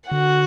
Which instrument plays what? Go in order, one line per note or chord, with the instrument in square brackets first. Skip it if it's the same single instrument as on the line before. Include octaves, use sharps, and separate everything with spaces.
[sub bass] D3 [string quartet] F#4 F#5